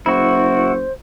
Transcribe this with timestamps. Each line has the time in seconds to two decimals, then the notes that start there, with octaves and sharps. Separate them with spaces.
0.06 F#1 E4 F#4 C5